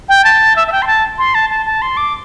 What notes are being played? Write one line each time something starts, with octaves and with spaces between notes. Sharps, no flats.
G5
A5
E5
E5
G5
C6
A5
C6
A5
A5
A5
C6
D6